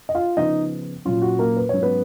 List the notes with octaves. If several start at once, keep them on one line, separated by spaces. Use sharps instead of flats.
D#5
F4 F5
C#3 F3 B3 D#4 D#5
A#2 F#3 C#4 F4
F#4
A#3 A#4
B4
G#2 F#3 C#4 C#5
B3 B4